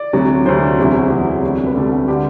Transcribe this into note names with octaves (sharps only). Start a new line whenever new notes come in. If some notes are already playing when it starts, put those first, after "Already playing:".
Already playing: D5
D2 C3 F#3
D2 C3 F#3 C5
E2 C3 F#3 E4
F#4
E2 C3 F#3 G4
D2 C3 G3
B4
D2 C3 G3 A4
F#4
D3 G3 G4